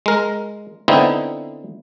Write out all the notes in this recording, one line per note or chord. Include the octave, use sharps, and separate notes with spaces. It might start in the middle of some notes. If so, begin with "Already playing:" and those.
G#3 A#4
D3 B3 C4 D#4 E4